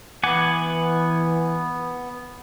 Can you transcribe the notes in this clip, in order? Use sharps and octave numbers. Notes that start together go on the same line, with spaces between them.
E3 B3 F#5 G#5 D6